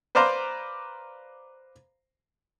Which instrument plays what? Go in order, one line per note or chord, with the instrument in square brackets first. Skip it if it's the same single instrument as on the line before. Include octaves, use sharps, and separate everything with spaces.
[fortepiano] B4 C5 D5 F5 A#5 C6